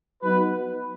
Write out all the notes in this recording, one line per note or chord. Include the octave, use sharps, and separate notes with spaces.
F#3 B3 D#4 F#4 B4